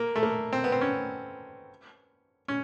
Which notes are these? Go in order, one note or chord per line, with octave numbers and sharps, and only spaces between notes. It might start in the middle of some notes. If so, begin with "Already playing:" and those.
Already playing: A#3
A3
A#3
C4
B3
C4
C#4
C#4